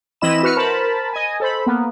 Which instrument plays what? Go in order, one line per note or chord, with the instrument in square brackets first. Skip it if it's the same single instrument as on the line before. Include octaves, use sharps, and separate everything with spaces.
[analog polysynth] E3 C4 E4 D#5 B5 E7
E4 F#4 B4 F6 C#7
A#4 C5 A5 B5
D#5 G#5
A4 C5 B5
A#3 B3